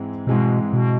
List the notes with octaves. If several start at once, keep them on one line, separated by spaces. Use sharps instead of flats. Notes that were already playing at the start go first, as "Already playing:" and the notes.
Already playing: G#2 E3 G#3 C4
G#2 B2 E3 G#3 C4
B2